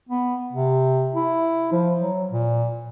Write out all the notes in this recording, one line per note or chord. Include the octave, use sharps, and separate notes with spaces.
B3
C3
E4
F3
F#3
A#2